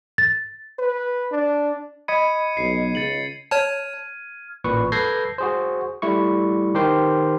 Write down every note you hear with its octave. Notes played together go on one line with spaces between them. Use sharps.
A6
B4
D4
D#5 B5 G#6 C#7 D#7
B1 C7
C#2 A6 C#7 F#7
C#5 A5 F6 G#6 D#7
A1 A#2 B4 C#6
A4 B4 G6 G#6 A#6 C7
F#4 G#4 C5
G3 A3 E4 C#6
D#3 G4 A#4 C5 G5 C6